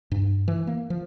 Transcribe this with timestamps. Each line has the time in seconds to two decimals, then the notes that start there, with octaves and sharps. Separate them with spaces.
0.11 G2
0.48 E3
0.67 A#3
0.90 F3